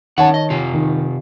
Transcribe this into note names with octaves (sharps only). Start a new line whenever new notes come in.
D#3 C#4 C#5 F#5 A5
D#5
C3 F4
D#3